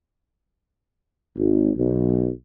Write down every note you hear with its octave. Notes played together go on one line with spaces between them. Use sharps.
G#1
B1